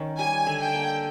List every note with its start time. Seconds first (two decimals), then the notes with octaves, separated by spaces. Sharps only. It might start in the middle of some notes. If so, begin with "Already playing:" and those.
Already playing: D#3 C#4
0.19 G3 G#5
0.46 D3
0.60 G5
0.74 A#3